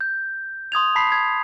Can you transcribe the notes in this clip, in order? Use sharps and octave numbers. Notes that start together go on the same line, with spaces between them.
G6
C6 D#6 G#6 F7
A5 B5 B6 C7
G#6